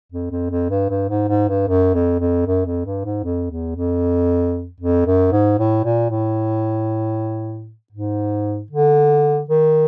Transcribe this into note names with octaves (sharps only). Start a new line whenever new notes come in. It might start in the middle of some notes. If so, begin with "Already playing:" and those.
F2
F2
F2
G2
G2
G#2
G#2
G2
F#2
F2
F2
F#2
F2
G2
G#2
F2
E2
F2
F2
F#2
G#2
A2
A#2
A2
G#2
D3
D#3